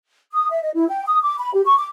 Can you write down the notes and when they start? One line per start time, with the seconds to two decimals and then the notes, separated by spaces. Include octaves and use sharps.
0.32 D#6
0.51 E5
0.63 D#5
0.75 E4
0.88 G5
1.06 D#6
1.22 D6
1.38 B5
1.54 G4
1.66 C#6
1.78 D6